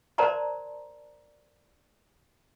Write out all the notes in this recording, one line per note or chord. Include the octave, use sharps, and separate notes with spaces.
A#4 C5 D5 A5 A#5 C6